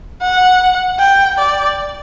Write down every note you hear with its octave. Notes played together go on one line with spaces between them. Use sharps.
F#5
G5
D5